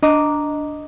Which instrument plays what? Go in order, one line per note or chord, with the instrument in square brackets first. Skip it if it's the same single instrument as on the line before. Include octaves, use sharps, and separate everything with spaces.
[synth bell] D4 [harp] D#5 A#5 D6